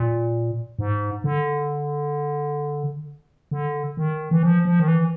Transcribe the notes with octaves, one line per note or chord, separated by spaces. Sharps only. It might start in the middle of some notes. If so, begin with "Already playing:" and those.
Already playing: A#2
G#2
D3
D3
D#3
E3
F3
F3
D#3
E3